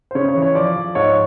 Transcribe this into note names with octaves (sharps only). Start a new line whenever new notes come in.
C5
C#3 C#5
C#5
E3
C#5
F3 D5
F3
G#2 C#5